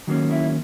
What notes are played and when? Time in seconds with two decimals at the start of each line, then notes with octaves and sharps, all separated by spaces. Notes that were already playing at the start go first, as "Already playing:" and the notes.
0.07 D#3 F#3 A#3 C#4
0.31 E4